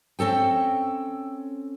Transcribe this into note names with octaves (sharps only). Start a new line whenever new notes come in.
C4 C#4 A4 G5